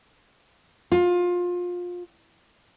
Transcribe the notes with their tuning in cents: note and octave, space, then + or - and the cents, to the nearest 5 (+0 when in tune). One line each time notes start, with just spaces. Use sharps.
F4 +25